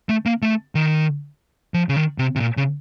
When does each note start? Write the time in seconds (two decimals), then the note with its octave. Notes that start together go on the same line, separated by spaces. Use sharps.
0.09 A3
0.26 A#3
0.42 A3
0.75 D#3
1.74 F3
1.89 C#3
1.96 D#3
2.18 C3
2.36 C3
2.40 A#2
2.57 C#3